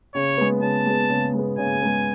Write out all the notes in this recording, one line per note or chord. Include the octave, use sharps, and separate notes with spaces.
C#3 C#5
G#3 B3
C#3 A5
G#3 B3
C#3
G#3
B3
C#3 G#5
G#3 B3